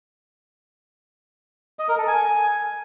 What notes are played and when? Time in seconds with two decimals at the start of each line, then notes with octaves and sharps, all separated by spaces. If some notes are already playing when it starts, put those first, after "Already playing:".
1.79 D#5
1.89 A#4
1.98 A4
2.08 G#5